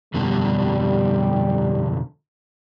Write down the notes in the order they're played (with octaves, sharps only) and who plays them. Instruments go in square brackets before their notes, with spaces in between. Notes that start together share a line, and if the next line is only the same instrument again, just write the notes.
[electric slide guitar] F2 B2 D3 [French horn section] G3